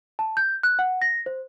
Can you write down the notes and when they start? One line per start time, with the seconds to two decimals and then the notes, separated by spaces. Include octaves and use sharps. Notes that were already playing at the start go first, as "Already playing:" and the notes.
0.19 A5
0.37 G6
0.63 F#6
0.79 F#5
1.02 A#6
1.26 C5